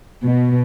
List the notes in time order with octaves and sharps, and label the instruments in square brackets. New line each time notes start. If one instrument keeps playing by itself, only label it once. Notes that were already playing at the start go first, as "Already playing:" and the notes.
[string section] B2